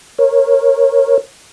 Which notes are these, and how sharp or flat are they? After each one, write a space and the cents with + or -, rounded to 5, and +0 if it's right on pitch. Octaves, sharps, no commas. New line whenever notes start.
A#4 +0 C#5 -20